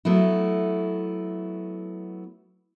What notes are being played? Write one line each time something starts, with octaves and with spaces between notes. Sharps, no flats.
F#3 A3 B3 E4